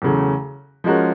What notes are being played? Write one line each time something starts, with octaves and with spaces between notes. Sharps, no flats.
E2 C#3 F#3 A3
F3 G#3 C#4 F#4 A#4